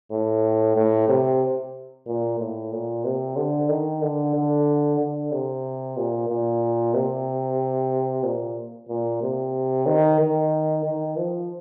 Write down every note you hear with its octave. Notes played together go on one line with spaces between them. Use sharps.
A2
A2
C3
A#2
A2
A#2
C3
D3
D#3
D3
D3
D3
C3
A#2
A#2
C3
A#2
A#2
C3
D#3
D#3
D#3
F3